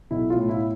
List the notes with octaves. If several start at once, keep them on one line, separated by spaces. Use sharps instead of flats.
B1 E4
F4
A2
E4